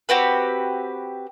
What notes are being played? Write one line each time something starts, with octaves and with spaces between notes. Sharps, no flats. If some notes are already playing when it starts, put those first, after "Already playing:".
C4 F#4 G4 B4